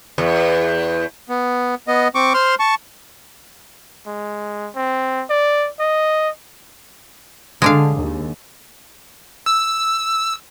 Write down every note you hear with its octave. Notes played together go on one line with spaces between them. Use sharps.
E2
B3
B3 D#5
C4 C#6 D6
C5 C6 F6
A5 C#6
G#3
C4
D5
D#5
D3 G#3 D4 F5
D#2
E6